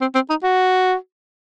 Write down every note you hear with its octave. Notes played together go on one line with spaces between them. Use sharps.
C4
C4
D#4
F#4